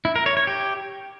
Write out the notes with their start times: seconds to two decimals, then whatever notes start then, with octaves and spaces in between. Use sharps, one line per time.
0.05 E4
0.16 A#4
0.26 C#5
0.37 C#5
0.47 G4